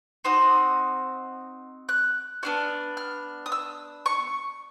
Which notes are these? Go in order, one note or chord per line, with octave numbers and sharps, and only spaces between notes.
C4 D#4 F#4 D#6
F#6
B3 D4 F#4 F6
F6
D#6
E6
C#6